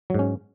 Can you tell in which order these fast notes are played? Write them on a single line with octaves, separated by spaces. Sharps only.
F#3 G#2 C#4